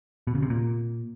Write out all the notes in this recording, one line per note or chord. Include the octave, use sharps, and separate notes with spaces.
B2
C#3
C3
A#2